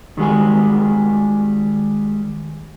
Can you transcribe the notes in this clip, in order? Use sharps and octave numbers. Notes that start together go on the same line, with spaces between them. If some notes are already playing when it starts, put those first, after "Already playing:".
D#3 G3 G#3 F#4 G#4